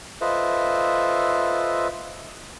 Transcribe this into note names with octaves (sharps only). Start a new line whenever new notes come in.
F4 A4 B4 C5 D#5 E5